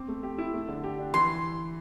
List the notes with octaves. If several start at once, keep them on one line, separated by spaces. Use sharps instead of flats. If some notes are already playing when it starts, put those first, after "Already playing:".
Already playing: C4 D6
A3
G4
E4
A3
D3
G4
D4
E3 C6